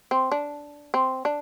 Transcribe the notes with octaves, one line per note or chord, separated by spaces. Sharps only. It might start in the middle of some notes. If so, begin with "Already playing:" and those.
C4
D4
C4
D4